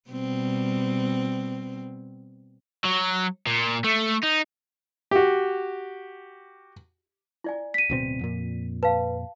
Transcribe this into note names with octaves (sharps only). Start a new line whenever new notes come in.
B2 G3 C4
F#3
A#2
A3
D#4
F#4 G4
E4 D5 G#5
B6 D#7
D1 B2 C4
F2 A#2
B4 F5 A5